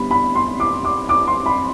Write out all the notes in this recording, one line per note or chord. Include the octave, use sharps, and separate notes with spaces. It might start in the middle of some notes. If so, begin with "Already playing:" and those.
Already playing: D3 G3 B3 B5
B5
C6
D6
D6
D6
C6
B5